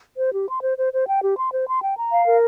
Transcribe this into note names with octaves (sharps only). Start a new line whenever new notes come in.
C5
G4
C6
C5
C5
C5
G5
G4
C6
C5
C6
G5
A#5
F5
A#4